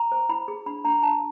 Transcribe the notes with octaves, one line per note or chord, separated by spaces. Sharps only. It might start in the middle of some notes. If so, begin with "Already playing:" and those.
Already playing: A#5
C5
E4 B5
G#4
D4 B5
D4 A#5
D4 A5